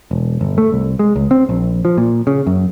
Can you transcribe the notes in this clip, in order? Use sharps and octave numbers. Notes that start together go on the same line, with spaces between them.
E1
G1
A3
C2
G#3
C#2
C4
A#1
F3
A#2
C#3
F#2